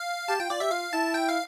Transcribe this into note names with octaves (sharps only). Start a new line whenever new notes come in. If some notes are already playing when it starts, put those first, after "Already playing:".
Already playing: F5
G4 A5
F4 G5
F4 D5
G4 E5
F4 F5
E4 A5
G5
F5